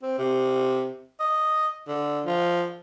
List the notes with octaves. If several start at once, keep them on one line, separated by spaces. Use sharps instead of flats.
C4
C3
D#5
D3
F3